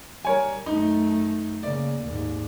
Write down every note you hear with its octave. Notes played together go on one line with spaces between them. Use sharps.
G3 A#4 C#5 G#5
F#2 A3 D#4
C#3 A#3 D5
D#2 G#2